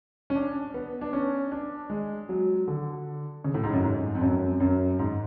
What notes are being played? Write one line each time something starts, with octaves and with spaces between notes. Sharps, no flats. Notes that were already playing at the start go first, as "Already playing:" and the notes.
C#4
D4
B3
D4
C#4
D4
G#3
F#3
D3
C#3
A2
G#2
F#2
G#2
F2
F#2
F#2
G#2